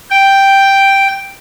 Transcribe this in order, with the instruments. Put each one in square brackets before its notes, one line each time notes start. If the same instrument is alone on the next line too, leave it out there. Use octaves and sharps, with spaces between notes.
[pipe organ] G5